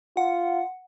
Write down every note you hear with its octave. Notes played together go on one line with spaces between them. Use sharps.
F4 F#5